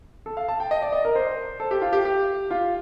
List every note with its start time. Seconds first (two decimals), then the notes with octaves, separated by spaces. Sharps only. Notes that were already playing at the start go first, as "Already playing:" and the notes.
0.26 A4
0.37 F5
0.48 A5
0.60 G5
0.71 D#5
0.82 D5
0.92 D#5
1.05 A#4
1.15 C5
1.60 A4
1.71 G4
1.82 F4
1.93 G4
2.05 G4
2.51 F4